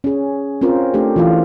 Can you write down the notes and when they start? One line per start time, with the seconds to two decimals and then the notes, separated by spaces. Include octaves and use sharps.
0.04 C#4 G#4
0.61 C4 C#4 F4 A#4 C5
0.94 A3 D4 G4
1.16 E3 F4 F5